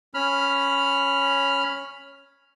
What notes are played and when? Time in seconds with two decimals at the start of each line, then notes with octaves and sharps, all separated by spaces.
0.14 C#4 B5 F6